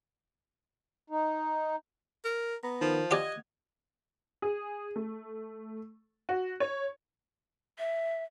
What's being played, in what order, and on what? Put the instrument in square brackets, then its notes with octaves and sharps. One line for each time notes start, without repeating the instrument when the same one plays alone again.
[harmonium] D#4
[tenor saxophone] A#4
[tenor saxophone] B3 [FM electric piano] A#5
[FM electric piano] D#3 A#4 [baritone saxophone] F3
[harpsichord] F4 G4 D5 [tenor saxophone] D#5 [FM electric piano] F#5 G#6
[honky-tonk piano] G#4
A3
F#4
C#5
[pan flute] E5